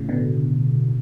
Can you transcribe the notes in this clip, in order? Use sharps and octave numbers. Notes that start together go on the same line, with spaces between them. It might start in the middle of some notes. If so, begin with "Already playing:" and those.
Already playing: A2 C#3
B2 D3